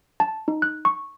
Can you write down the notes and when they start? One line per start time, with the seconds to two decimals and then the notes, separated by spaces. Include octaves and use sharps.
0.20 A5
0.48 D#4
0.62 F#6
0.85 C#6